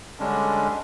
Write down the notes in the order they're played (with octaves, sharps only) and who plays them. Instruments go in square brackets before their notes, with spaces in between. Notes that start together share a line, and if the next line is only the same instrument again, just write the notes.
[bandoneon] D3 G3 G#3 C#4 D4